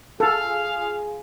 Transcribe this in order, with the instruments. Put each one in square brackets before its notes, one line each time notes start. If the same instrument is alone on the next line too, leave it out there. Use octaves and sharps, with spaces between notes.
[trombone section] F4 G#4 [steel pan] A4 [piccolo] F5